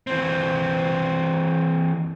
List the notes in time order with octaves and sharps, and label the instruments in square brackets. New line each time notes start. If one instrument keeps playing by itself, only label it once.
[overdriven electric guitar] E3 C4